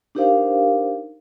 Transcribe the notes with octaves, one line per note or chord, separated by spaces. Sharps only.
D4 D#4 G4 A#4 C5 F5